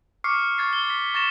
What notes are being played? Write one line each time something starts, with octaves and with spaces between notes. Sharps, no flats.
C#6 D6 F6 C7 C#7
C#6 G#6 A6 C7
C7 G7
B6
C#6 A6 A#6 E7